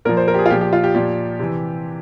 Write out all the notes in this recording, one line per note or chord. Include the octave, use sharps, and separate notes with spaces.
A#2 F3 A#4
C5
A#4
G4
G#4
F4
A#2 F3 G4
G4
F4
G4
A#2 F3 G4
C3 E3